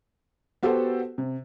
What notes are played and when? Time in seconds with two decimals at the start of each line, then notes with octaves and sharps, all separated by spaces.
0.63 B3 F#4 G4 A4 C5 F#5
1.18 C3